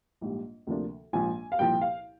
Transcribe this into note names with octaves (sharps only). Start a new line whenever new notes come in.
A#1 G#2 G3
D2 C3 F3 A#3 D4
A#1 G#2 F3 G#5
F5
C2 A#2 F3 G5
F5